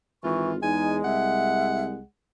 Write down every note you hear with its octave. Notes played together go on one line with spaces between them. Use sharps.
G#1 E3 F4 C#6
E2 G#3 D#4 G#5
C2 E5 F#5